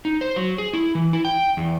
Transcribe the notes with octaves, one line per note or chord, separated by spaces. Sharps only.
D#4
C5
F#3
G#4
E4
E3
E4
G5
E2